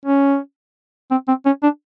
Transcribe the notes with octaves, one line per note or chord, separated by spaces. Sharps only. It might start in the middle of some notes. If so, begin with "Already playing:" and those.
C#4
C4
C4
C#4
D4